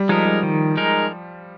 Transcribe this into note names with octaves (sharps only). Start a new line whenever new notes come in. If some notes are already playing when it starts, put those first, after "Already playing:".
Already playing: G3
F3 G#3 D#4 A#4
G3
D#3
G#3 D#4 A#4